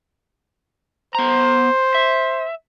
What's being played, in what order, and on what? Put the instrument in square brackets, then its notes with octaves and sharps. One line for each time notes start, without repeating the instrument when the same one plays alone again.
[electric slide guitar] B3 A#5 [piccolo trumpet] C5
[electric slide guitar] E5